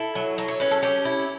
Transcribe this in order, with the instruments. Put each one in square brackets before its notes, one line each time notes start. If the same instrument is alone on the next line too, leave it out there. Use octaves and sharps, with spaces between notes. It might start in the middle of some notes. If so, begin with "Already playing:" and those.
Already playing: [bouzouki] E4 A4
F#3
F#3
C#5
C#4 B4
A4
C#4 G4
E4